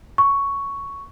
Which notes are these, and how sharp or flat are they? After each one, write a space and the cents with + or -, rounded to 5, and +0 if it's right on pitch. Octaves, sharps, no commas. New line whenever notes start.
C#6 +5